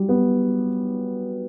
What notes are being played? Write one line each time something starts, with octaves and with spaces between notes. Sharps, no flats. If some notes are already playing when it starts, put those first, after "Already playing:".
Already playing: F#3 G3
B3